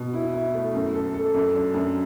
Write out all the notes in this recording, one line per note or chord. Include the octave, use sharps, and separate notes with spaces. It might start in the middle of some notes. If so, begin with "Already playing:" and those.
Already playing: B2
E4
E4
A3
F#2
A4
A4
F#2
D4
F#2